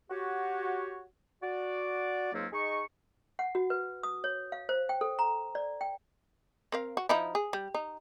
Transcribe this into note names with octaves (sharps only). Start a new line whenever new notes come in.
F#4 G4 C#5
F#4 D5
C#2 G#2 F#3 A#3 C4 C#4
D#4 G#4 D#5 C#6
F#5
F#4
B4
D#6
C#5
F5
C5
G5
A4
A#5
D5
G5
C4 A#4 F5
F#4
F3 D#4 E4
G#4
G3
D#4